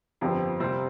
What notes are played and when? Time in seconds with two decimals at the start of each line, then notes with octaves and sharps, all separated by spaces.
0.21 G1 F2 F3 C4 G4
0.60 C3 G3 C4